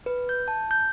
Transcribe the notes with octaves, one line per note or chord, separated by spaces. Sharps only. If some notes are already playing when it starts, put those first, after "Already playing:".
B4
G6
A5
G6